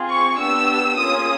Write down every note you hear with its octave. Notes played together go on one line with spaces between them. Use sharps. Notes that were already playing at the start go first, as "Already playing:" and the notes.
Already playing: C4 F4 G#4
C#6
B3 D4 G4 E6
A#3 C#4 F4 G#4 D#6